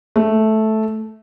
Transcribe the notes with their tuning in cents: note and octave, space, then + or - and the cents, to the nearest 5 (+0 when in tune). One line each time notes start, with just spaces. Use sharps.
A3 -10